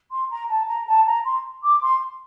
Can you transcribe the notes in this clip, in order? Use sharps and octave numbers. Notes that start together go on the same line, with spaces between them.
C6
A#5
A5
A#5
A5
A#5
C6
D6
C6